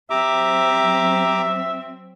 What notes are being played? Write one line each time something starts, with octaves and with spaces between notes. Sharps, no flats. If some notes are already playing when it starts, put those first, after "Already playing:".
F#3 C4 G4 E5 A#5 D6